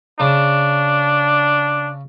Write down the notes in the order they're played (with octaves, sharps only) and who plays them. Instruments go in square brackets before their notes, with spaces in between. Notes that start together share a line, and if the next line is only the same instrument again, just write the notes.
[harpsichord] C#3 [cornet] D4